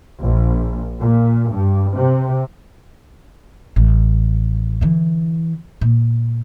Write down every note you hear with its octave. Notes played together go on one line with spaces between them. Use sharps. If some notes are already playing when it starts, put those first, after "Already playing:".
A#1
A#2
G2
C3
A1
D3 E3
A#2